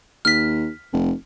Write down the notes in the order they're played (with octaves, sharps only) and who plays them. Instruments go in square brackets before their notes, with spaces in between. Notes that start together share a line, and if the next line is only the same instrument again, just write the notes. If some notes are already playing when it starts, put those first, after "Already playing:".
[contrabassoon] D#2 [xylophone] F6 B6
[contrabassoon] F1